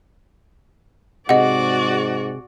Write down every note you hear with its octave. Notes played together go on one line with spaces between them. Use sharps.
G#2 C3 F#4 G#4 D5 D#5 F#5